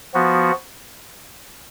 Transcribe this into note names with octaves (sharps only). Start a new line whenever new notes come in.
F3 B3 F#4